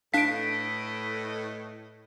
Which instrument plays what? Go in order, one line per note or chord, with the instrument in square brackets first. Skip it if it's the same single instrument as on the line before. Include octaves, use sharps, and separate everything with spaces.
[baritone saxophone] A2 [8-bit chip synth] D4 F5 [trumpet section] A4 B4 D#5 [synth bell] B6 D7